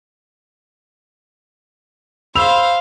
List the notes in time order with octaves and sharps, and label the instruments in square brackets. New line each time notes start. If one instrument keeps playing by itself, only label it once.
[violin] C5 F5 [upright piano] B5 E6 F7